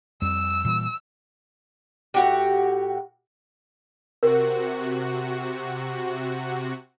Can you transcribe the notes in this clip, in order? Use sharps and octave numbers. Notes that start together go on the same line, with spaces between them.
F2 G3 E6
A#2 E3 G3
A2 F#4 G4
C3 F#4 A#4